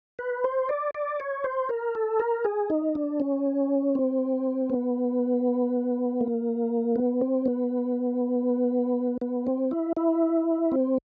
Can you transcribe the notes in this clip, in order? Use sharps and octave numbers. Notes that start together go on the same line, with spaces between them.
B4
C5
D5
D5
C#5
C5
A#4
A4
A#4
G#4
D#4
D4
C#4
C4
B3
A#3
B3
C4
B3
B3
C4
E4
E4
C4